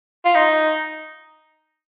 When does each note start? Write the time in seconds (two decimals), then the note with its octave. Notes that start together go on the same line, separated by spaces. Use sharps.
0.25 F4
0.35 D#4